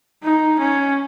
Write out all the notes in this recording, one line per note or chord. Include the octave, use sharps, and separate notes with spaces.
D#4
C#4